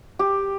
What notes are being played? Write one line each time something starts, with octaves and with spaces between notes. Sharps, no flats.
G4